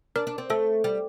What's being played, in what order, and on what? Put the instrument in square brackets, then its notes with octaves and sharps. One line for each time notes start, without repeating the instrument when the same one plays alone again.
[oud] D4 [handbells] A#4
[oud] D4
C4
[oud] A3 [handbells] A4
[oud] G3